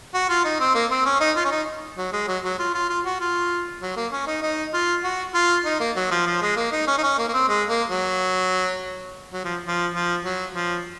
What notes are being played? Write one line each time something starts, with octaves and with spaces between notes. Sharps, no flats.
F#4
F4
D#4
C4
A#3
C4
C#4
D#4
F4
C#4
D#4
F#3
G#3
F#3
F#3
F4
F4
F4
F#4
F4
F#3
A#3
C#4
D#4
D#4
F4
F#4
F4
D#4
A#3
F#3
F3
F3
G#3
A#3
D#4
C#4
D#4
C#4
A#3
A#3
C4
G#3
A#3
F#3
F#3
F3
F3
F3
F#3
F3